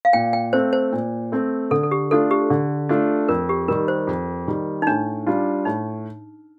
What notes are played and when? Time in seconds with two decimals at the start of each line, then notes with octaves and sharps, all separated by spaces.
0.05 F5
0.13 A#2 G5
0.33 G5
0.53 A3 C4 C5
0.73 C5
0.93 A#2
1.32 A3 C4
1.71 D3 A4
1.83 A4
1.91 G4
2.11 A3 D4 F4 A4
2.31 G4
2.50 D3
2.89 A3 D4 F4
3.28 F2 A#4
3.49 G4
3.68 D#3 G3 A#4
3.88 C5
4.07 F2
4.48 D#3 G3
4.82 D#4
4.87 A2 D4
5.27 G3 D4 F4
5.65 A2 D#4